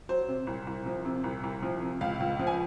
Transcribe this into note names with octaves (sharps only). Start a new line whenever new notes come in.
F#3 C5
C3
C2
C2
F3
C3
C2
C2
F3
C3
C#2 F5
C#2
F3
G#5